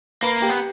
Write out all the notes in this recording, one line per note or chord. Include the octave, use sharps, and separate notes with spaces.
A#3 B4 B5
G4 G5
B3